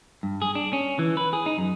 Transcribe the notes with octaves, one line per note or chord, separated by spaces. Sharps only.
G2
G#4
D4
C#4
E3
B4
G#4
D#4
F#2